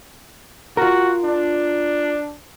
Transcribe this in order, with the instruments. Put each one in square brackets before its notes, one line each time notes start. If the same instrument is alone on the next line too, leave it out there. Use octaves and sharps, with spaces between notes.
[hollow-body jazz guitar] F4 A#4 [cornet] F#4
[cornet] D4